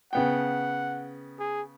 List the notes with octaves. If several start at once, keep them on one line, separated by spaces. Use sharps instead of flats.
C#3 B3 F#5 G5
G#4